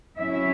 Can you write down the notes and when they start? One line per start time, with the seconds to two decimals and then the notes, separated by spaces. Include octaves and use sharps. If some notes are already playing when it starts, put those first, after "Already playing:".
0.18 F#3 C#4 E4 E5